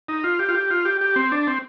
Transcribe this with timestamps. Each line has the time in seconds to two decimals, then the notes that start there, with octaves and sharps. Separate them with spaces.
0.08 D#4
0.24 F4
0.39 G4
0.49 F4
0.55 G4
0.70 F4
0.85 G4
1.01 G4
1.16 C4
1.32 D4
1.47 C4